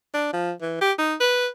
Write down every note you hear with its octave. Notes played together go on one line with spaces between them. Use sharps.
D4
F3
E3
G4
D#4
B4